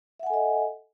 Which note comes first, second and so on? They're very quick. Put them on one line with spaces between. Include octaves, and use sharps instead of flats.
E5 F#5 G#5 A4 D#5